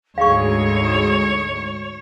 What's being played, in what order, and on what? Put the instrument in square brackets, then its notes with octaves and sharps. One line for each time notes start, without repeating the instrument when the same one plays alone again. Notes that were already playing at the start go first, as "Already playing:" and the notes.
[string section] D2 G#2 [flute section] G#4 [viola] C#5 [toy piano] F5 C#6